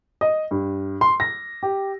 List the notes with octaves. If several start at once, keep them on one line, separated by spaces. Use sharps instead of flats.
D#5
G2
C6
A#6
G4